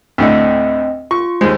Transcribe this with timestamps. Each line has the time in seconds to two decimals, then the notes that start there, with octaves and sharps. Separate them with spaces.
0.18 D2 A2 D3 C4 D#5
1.11 F4 C#6
1.41 D#2 G#3 C5